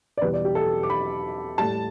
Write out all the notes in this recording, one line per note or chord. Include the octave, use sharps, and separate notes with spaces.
D5
E2 B2 G3 B4
D5
G4
A4
D6
B5
A2 G3 A5